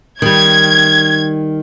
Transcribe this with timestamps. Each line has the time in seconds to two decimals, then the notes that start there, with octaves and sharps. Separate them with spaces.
0.22 D#3 G3 G#6